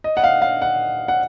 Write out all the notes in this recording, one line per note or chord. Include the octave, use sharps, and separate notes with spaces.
D#5
F#5
F5
F5
F#5
F#5